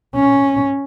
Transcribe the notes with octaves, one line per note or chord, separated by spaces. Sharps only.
C#4